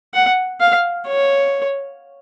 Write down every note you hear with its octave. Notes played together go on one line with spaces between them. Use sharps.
F#5
F5
C#5